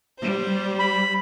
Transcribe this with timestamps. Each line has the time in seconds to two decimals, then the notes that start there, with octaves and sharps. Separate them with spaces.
0.17 G3 C5
0.79 B5